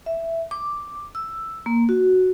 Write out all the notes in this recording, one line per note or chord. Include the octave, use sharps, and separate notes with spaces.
E5
D6
E6
A#3
F#4